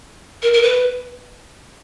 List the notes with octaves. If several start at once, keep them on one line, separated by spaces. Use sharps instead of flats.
A#4
A#4
B4